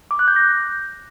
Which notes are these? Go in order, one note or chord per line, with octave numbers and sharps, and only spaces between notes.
D6
F#6
G6
A#6